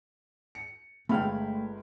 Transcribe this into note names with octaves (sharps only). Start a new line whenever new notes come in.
C#7
G1 G#3 A3 F5 G5 B5